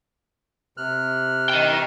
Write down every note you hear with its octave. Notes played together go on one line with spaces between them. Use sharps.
C3 F6 F#6
D#5 G5